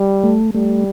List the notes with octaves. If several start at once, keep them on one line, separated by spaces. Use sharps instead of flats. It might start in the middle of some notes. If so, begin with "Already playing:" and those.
Already playing: G3
A3
G3 A3